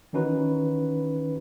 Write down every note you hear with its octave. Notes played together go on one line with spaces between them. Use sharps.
D#3 E3 C#4 D#4 F#4 B4